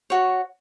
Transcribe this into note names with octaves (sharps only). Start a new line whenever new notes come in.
F#4 C#5